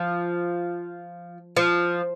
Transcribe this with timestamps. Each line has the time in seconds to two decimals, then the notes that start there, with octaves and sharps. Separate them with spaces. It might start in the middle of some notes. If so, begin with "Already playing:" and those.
Already playing: F3
1.57 F3